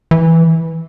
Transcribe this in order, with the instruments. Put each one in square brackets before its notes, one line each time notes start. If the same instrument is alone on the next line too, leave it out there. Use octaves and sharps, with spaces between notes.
[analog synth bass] E3